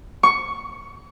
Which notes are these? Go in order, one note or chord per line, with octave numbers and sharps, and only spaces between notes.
C#6